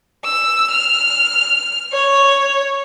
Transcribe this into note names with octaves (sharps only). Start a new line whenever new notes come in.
E6
F6
C#5